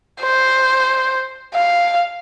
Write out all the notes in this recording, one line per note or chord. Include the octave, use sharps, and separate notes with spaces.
C5
F5